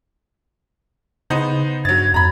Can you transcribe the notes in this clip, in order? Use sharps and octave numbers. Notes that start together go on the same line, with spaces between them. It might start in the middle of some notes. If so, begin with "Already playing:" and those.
C#3 B3 D#4 C5
G2 F#3 G#6 A6
F2 A#5 B5